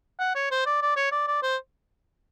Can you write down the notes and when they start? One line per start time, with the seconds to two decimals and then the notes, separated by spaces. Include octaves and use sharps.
0.19 F#5
0.35 C#5
0.51 C5
0.66 D5
0.82 D5
0.96 C#5
1.12 D5
1.28 D5
1.42 C5